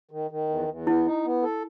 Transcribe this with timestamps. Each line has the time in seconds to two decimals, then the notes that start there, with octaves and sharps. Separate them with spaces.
0.11 D#3
0.31 D#3
0.49 E2
0.68 E2
0.86 B3 E4
1.06 D#4
1.24 B3
1.43 A4